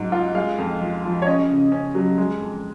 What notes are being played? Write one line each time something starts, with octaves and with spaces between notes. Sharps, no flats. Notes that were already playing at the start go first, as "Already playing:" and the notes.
Already playing: G#2 F#3
F4
G#3 F5
F2
F3
F3
C#5
C#4 D#5
C#3
C#4
F#3
G#3
F2